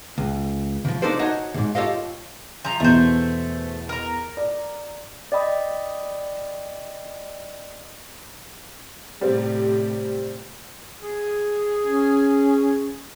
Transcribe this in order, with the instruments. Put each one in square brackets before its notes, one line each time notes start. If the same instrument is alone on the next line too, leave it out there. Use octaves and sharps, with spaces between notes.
[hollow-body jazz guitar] C#2
C#3 F3
A#3 D4 D#4 A4 A#4 C5
D#4 F#4 C#5 D#5 A5
G#2 C3
F4 G4 A4 C#5 D#5 F5
[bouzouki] F3 A#5
[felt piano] E2 B2 [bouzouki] A3 C5
[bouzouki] A#4 A#5
[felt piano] D5
[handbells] D5 D#5 G5 B5 D#6
[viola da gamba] A2 C3 [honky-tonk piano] G3 C4
[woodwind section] G#4
[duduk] C#4